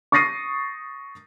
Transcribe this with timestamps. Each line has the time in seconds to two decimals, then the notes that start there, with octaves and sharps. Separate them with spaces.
0.12 C#6 D#6 A6 A#6 C7 D#7